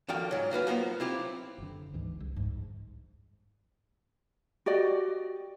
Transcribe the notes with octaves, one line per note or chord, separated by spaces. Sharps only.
D3 D#3 F3 F#4 F5 G5
G#2 F#3
F4 F#4 B4 F5
F#3 A#3 B3 F4 C5
C4 E4 F4 G4
F#1 D3
D2 G#2 E3
C2
G#2
F#4 G4 D5 D#5